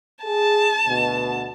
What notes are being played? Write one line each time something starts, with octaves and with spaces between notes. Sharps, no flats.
G#4 A5
D2 B2